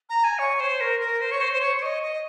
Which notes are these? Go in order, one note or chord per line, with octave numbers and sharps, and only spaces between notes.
A#5
G#5
C#5
C5
A#4
A#4
C5
C#5
C5
C5
C#5
C#5
D#5
D#5